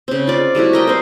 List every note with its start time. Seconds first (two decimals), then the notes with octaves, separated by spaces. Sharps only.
0.08 C#3 C4
0.27 F4 D5
0.55 G3 A3 E4 F#4
0.73 A#4 D#5 G5
0.87 C4 C5